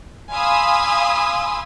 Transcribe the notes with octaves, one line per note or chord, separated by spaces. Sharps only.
F5 G#5 B5 C6 D#6 E6